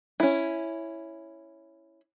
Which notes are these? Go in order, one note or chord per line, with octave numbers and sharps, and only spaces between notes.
C#4 E4